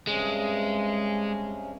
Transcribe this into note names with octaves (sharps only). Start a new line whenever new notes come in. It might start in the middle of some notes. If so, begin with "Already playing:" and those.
G2 C3 G#3 C#4